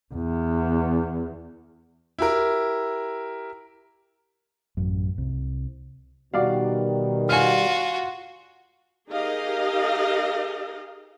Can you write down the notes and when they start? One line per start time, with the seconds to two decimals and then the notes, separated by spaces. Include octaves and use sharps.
0.14 E2
2.19 E4 G4 A#4
4.77 A1 F#2
5.18 C2
6.34 B2 D#3 G3 F#4 D5 F5
7.29 F4 F#4 G#5 F6
9.11 D#4 G4 G#4 A#4 D#5 F5